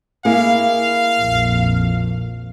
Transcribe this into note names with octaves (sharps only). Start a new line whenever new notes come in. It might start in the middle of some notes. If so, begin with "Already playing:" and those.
A#3 E4 G#4 F5
A#1 F2